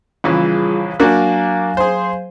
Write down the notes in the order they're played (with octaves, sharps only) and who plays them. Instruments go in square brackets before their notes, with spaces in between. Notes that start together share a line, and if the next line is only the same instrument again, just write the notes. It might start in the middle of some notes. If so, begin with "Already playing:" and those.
[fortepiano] A#1 C#3 E3 [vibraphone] G3 F4 G#4
[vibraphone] F#3 F5 G#5 [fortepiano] A#3 D4 F#4
[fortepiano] G#4 C5